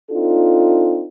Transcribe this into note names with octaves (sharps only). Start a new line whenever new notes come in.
C4 D4 D#4 F4 A4